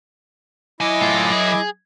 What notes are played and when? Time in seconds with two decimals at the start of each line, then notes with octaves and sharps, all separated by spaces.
0.81 F#3 E4 D#5 G#5 D6
1.01 A2 F4
1.32 G#4